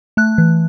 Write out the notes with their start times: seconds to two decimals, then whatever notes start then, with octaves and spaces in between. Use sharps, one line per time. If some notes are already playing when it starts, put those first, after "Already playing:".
0.17 A3 F#6
0.38 E3